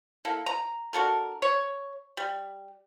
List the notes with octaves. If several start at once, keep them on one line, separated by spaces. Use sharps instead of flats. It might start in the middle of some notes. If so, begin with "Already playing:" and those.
A#3 E4 A4
A#5
D4 F#4 A4 A#4
C#5
G3